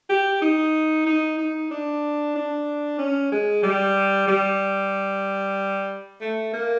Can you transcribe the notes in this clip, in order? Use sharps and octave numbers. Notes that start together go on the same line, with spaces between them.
G4
D#4
D#4
D#4
D4
D4
C#4
G#3
G3
G3
A3
A#3